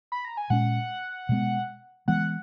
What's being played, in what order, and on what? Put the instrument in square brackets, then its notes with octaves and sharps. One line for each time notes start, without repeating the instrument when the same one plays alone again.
[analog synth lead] B5
A#5
G#5
[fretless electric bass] A#2 G#3 C#4 [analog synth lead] F#5
[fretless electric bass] B2 G#3 B3
[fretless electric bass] E3 G#3 B3 [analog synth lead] F#5